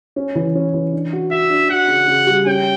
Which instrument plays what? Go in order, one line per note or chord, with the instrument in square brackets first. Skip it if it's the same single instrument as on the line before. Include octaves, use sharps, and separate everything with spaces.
[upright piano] C#4
E3
C#4
E3
D4
F#4
[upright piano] F#4 [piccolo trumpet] E5
[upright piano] D4
[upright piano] F#4 [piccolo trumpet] F#5
[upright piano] C#3
C#3
G3
[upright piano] C#4 [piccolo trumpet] G5